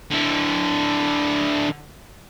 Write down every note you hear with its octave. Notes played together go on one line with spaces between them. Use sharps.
D3 E4